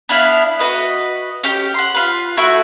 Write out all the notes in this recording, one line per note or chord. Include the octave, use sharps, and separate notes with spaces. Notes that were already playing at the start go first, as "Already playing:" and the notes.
B3 D4 E4 F5
F#4 B4 D#5
C#4 G4
F#5 C6
F4 B4
A3 E4 F#4 C#6